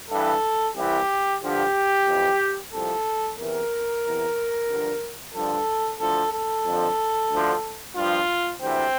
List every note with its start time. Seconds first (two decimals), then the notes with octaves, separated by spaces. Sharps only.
0.10 G2 E3 A4
0.76 C2 C3 E3 G4
1.41 G2 D3 F3 G4
2.07 F2 E3
2.72 C2 C3 F3 A4
3.37 E2 C3 E3 A#4
4.04 E2 C3 E3
4.69 G2 D3 F3
5.34 G2 D3 F3 A4
6.00 D2 D3 F3 A4
6.33 A4
6.65 F2 D3 F3
7.30 D2 D3 F3
7.96 G2 F3 F4
8.62 D2 C3 E3 C4